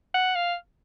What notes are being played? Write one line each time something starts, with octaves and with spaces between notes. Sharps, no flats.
F#5
F5